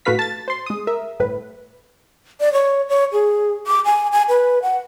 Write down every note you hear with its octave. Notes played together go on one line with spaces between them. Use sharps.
A2 A3 F#4 B4 F5 B6
A5 A6
C5 C6
G#3 D#6
A#4 E5
G1 A2 B4
D5
C#5
C#5
G#4
D6
G#5
G#5
B4
F#5